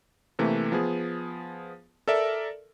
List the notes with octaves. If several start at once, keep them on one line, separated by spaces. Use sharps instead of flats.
C3 E3 A3 A#3
F3 B3 G#4
A4 A#4 D5 E5